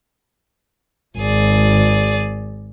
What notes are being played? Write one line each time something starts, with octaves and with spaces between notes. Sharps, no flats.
G#1 G#4 D5